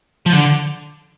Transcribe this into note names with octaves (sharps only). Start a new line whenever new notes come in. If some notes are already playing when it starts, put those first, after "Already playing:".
F3
D3